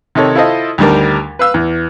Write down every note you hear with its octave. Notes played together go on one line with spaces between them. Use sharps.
C3 D#3 D#4 A4 C#5
E4 F4 A4 C5 D#5 E5
D2 D#3 G3 D4 A#4
B4 F5 E6
E2